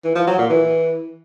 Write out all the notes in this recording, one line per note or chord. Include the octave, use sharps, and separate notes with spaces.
E3
F3
F#3
A#2
E3